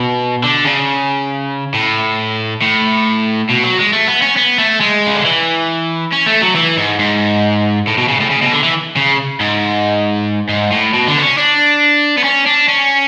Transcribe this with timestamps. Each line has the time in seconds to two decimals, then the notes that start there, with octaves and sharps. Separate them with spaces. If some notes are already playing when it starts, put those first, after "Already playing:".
Already playing: B2
0.44 D3
0.65 C#3
1.74 A2
2.62 A2
3.50 B2
3.64 F#3
3.79 G#3
3.93 A3
4.08 B3
4.22 C#4
4.37 B3
4.58 A3
4.81 G#3
5.07 C#3
5.15 D3
5.25 E3
6.13 C#4
6.27 A3
6.42 F#3
6.55 E3
6.77 G#2
6.99 G#2
7.87 A2
7.98 B2
8.08 C#3
8.20 A2
8.30 C#3
8.42 B2
8.53 D3
8.63 E3
8.97 C#3
9.40 G#2
10.49 G#2
10.72 A2
10.94 B2
11.08 D3
11.17 B3
11.22 C#4
11.37 D4
12.18 B3
12.24 C#4
12.46 D4
12.69 C#4